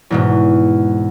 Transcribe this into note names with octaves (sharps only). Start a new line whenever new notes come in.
E2 G#2 B2